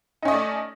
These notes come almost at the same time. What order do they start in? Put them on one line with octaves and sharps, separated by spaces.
D#4 C#4 D#5 A3 D5